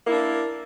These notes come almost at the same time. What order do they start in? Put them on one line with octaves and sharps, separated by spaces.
A#3 E4 D4